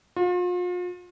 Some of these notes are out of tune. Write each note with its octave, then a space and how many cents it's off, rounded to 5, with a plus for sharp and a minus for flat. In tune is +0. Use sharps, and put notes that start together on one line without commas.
F4 +40